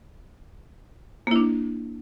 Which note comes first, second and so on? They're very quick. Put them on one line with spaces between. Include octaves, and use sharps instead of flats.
A#3 E4 D4